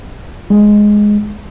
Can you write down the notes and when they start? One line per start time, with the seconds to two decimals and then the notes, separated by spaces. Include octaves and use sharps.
0.50 G#3